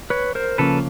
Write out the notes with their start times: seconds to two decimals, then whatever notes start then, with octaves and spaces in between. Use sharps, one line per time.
0.10 B4 C#5
0.35 A#4 C5
0.58 C#3 F3 A#3 C#4 A4 B4